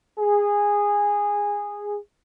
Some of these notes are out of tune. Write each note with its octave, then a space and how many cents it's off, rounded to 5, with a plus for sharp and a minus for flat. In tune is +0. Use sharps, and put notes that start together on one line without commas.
G#4 -15